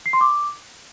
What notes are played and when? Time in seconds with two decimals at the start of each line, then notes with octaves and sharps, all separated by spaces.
0.06 C7
0.13 C6
0.21 D6